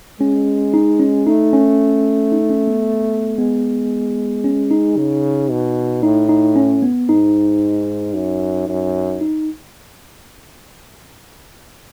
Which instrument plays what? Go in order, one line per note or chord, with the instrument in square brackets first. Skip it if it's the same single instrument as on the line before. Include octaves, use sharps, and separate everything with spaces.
[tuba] G#3 [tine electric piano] C#4
[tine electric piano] D#4
C#4
[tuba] A3 [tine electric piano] D#4
[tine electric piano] C#4
D#4
C#4
B3
[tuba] G#3 [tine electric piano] B3
[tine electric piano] C#4
D#4
[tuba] C#3
B2
[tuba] A2 [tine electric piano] D#4
[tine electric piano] D#4
C#4
B3
[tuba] G#2 [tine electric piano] D#4
[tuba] F#2
F#2
[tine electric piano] D#4